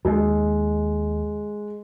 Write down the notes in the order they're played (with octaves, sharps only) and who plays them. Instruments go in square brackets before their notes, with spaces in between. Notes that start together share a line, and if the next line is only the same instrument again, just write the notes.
[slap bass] D#2 [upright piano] G#3